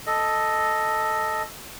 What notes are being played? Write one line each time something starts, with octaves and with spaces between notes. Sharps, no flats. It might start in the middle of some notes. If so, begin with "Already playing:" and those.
A4 D#5